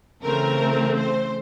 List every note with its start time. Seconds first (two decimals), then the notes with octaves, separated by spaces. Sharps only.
0.23 C#3 E3 A3 C4 A#4
0.97 C5